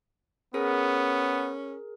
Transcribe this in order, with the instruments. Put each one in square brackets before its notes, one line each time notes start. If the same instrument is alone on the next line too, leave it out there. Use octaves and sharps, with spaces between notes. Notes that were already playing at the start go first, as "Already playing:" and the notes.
[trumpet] B3 [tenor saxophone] C#4 [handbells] G#4 A#4